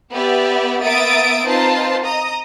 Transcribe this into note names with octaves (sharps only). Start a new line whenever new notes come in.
B3 G4 B4 D5 E5
A#3 B3 E5 D#6 A6 D7
C4 D#4 F4 B4 C5 A5
D#5 A#5 D#6 A#6